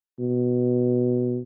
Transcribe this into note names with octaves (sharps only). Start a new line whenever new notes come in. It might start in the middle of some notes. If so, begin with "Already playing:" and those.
B2